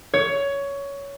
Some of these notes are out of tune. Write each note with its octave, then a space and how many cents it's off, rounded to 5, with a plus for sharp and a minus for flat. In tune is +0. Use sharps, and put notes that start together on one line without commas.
C#5 +15